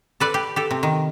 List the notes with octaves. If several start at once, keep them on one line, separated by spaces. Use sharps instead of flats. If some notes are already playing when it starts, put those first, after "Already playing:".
A4 B4 D5
G4
G4 A4
C3
D#3